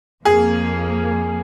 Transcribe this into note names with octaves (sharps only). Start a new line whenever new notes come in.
F2 F3 A#3 G#4